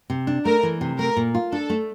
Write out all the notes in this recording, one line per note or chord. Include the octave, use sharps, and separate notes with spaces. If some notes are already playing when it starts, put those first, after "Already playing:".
C3
D4
A3 A#4
E3
C3
A3 A#4
A#2
F4
D4 A4
A3